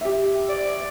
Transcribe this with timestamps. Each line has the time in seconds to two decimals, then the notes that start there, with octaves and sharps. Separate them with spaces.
0.01 G4 E5
0.49 D5